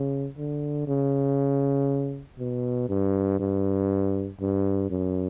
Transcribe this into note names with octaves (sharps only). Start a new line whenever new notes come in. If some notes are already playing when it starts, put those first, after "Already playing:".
Already playing: C#3
D3
C#3
B2
G2
G2
G2
F#2